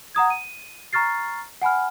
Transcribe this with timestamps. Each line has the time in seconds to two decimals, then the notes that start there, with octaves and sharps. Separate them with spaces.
0.15 F#5 A#5 D#6 G#6
0.30 D#7
0.93 A#5 C#6 F6 A6 C7
1.61 F#5 G#5 B5 F6